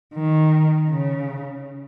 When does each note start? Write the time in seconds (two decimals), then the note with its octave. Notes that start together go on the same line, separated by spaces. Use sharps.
0.14 D#3
0.89 C#3